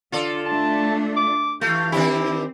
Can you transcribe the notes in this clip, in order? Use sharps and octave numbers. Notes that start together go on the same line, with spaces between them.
D3 F4 A4 D5
A3 D4 A5
D6
E3 A3 F4 G4 F5
D#3 C4 D4 E4 G4